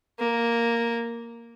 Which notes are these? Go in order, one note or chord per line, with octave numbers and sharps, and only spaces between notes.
A#3